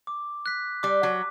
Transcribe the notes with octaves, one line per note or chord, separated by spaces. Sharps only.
D6
F#6 B6
G3 D6
F#3